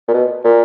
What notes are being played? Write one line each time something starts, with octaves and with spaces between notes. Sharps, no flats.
A#2
B2
A#2